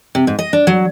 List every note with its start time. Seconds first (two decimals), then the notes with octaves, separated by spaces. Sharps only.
0.15 C3
0.27 G#2
0.39 D#5
0.53 D4
0.67 F#3